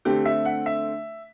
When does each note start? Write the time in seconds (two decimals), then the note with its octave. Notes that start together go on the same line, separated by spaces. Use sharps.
0.05 D3 A3 C4 G4
0.25 E5
0.45 F#5
0.66 E5